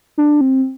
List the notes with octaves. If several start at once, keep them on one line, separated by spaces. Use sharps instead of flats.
D4
C4